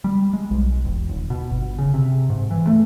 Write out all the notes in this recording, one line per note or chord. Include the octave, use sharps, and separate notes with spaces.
G3
G#3
B1
E1
D#1
B2
G1
C#3
C3
G#2
E3
A3